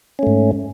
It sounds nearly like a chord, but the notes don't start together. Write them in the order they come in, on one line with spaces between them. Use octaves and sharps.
C#4 A3 G#2